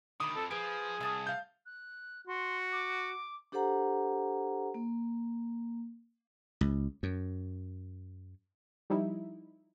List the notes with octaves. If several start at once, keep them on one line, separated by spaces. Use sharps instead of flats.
D2 D#3 B5 D6 D#6
F2 A4
F3 G#4 B4 D7
C2 E5 A5 D#6
F5 G6
F#6
F#4 C6
D6
D4 G4 A4 C5 F#5 A#5
A#3
C#2
F#2
F3 G3 D#4 E4